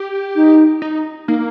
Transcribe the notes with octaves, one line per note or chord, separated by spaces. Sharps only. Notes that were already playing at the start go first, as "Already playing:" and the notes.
Already playing: G4
D#4
D#4
A#3 D#4